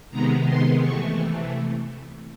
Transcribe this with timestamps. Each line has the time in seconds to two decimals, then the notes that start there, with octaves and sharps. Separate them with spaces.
0.11 C3 D#3 G#3 B3 A#5
0.46 C6
0.81 C3 E3 A3 C#6